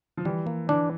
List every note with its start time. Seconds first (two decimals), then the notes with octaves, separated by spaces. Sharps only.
0.17 F3
0.25 E3 G3
0.47 A#3
0.69 E3 D4